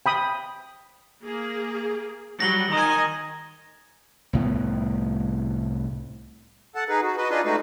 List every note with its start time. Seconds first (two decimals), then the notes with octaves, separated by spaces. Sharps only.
0.06 G5 B5 D#6
1.24 A#3 G#4
2.40 F#3 G3 A#6 F#7 G7
2.72 D#3 D#5 G#5 A#5 D#6
4.33 C2 A2 B3
6.75 A4 F#5 A5
6.89 D#4 G#4 B4
7.02 F#4
7.18 F#4 B4 D#5
7.30 D4 D#4 F4 G#4 B4 D#5
7.45 G#3 A3 D#4 F#4 B4